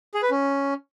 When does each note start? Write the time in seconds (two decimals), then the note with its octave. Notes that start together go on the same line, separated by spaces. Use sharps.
0.14 G#4
0.22 B4
0.31 C#4